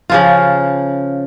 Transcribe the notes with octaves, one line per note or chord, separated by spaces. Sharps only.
C#3 F3 F4